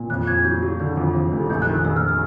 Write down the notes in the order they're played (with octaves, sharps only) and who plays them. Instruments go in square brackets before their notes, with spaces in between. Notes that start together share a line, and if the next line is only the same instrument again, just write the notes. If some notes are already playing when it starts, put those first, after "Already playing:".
Already playing: [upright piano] A#2
[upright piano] F2 [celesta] F#6
[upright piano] F2 [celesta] G#6
[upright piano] F#3 [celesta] G6
[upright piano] F#3
[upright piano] D3 [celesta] G6
[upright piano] F2
F2
F1
[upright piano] A#1 [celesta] G6
[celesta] F#6
[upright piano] D#3
[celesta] E6
[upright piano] A#1 [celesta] E6
[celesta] F6
E6